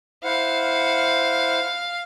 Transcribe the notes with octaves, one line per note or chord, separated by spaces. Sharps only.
E4 C5 F5 F#5